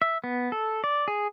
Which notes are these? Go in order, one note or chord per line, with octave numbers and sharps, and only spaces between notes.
E5
B3
A4
D5
G#4